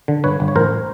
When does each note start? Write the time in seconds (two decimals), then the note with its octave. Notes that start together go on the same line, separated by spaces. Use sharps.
0.08 D3
0.24 G1 B4 C#5
0.40 G1
0.48 C#5
0.56 A1 A#4 C5